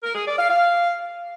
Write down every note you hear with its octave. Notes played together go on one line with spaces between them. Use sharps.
A#4
G#4
D5
F5
F5